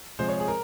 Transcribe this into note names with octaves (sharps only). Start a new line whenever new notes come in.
C3 F3 G#3 C5
C#5
G#4
A#4